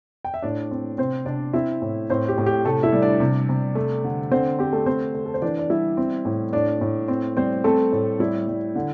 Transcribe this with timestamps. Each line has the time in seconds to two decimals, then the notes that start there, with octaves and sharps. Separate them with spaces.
0.25 G5
0.34 E5
0.42 A2 D4 D5
0.71 C4
0.98 C3 C4 C5
1.26 C3 D4 D5
1.53 C4 E4 E5
1.82 A2
2.10 A2 C4 C5
2.28 G4
2.38 A2
2.46 G4
2.64 C3 A3 A4
2.83 E4 E5
2.92 G3
3.02 D4 D5
3.20 C3
3.49 C3
3.75 A3
4.04 D3
4.31 D3 C4 C5
4.59 C4 G4
4.73 A3 A4
4.86 A3 C4 C5
5.15 A3
5.26 A4
5.34 C5
5.42 E3 D4 D5
5.59 D5
5.70 G3 E4 E5
5.97 C4
6.25 A2
6.53 A2 D4 D5
6.81 A2
7.08 C4
7.37 G3 C4 C5
7.64 A3 C4 A4
7.92 A2
8.19 G3 E4
8.48 G3
8.75 D3